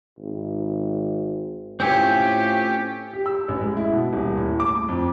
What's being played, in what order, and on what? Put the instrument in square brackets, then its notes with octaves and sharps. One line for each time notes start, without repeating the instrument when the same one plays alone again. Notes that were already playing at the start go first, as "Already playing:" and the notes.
[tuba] G#1
[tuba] A2 [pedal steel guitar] C4 C#4 F4 [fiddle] G4
[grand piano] G4
E6
A1
G#3
E4
B2
D#1
A2
D6
F2